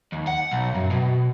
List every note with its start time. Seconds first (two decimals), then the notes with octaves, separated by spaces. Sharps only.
0.12 D#2
0.27 F#5
0.51 B1
0.75 F#2
0.91 B2